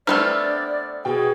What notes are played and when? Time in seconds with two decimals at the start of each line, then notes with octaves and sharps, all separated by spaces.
0.07 A3 B3 C4 D4 D5 E6 F6
1.05 B2 G#4 G5